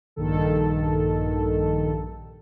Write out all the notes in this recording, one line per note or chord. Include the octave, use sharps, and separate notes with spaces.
A#1 G2 D#3 A4